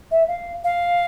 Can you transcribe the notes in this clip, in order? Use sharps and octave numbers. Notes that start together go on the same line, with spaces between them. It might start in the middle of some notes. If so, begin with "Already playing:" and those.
E5
F5
F5